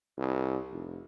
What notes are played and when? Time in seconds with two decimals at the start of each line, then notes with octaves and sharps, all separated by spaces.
0.18 C2
0.71 F1